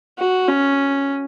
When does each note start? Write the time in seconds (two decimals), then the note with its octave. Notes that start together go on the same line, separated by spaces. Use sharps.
0.19 F#4
0.48 C#4